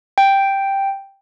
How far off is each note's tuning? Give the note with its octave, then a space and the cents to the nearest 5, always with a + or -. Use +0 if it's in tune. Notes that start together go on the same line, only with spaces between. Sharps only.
G5 +0